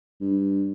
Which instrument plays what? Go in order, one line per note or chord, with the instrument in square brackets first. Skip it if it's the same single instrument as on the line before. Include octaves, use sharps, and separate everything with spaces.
[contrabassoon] G2